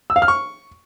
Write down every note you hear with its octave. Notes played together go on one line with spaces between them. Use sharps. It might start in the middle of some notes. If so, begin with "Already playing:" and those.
E6
F5
F6
C#6